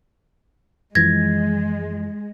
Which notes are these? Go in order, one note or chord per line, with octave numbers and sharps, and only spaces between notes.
F#2 E3 F3 G#3 G#6 A#6